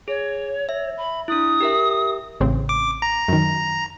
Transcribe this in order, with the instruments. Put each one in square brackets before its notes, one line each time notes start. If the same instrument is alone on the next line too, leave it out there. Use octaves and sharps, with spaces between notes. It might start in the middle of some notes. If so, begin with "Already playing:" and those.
[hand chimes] G#4 [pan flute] C#5
[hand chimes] E5
[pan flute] B5
[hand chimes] D4 E4 [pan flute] D#6
[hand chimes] G4 A#4 E5
[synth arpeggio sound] A1 C#3 C4
[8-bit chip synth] D6
A#5
[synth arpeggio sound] F#2 D#3